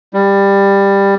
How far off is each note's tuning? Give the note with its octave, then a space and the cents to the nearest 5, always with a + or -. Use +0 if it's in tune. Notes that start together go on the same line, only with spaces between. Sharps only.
G3 +15